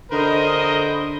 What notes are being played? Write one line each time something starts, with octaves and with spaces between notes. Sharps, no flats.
D3 A#4 C5 D#5 B5